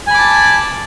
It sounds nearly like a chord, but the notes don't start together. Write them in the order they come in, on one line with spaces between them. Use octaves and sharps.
G#5 B5 D6 A5